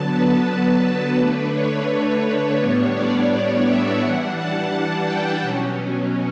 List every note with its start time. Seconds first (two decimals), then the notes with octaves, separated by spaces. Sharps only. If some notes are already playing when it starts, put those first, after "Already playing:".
Already playing: D3 F#3 B3 A5
0.11 B4
0.82 B4
1.18 D3 A3 D4 B4
1.53 C#5
2.59 A2 G3 B3 D4 C#5
2.94 D5
3.65 E5
4.00 E3 G3 D4 F#5
4.35 A5
5.06 G5
5.41 B2 F#3 C#4